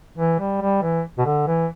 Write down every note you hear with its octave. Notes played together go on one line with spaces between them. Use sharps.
E3
G3
G3
E3
B2
D3
E3